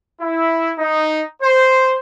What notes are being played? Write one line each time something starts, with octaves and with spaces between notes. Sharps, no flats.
E4
D#4
C5